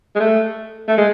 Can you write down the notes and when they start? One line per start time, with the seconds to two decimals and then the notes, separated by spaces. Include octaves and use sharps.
0.15 G#3
0.20 A3
0.88 A3
0.98 G#3